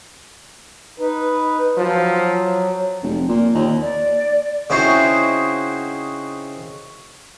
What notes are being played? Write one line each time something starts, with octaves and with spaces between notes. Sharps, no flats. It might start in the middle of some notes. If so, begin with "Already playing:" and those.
D#4 B4
F3 F#3
F1
A#2
D#2
D5
C#3 C4 D#4 E4 F#4 C5